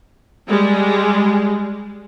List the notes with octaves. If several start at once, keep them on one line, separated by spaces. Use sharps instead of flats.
G3 G#3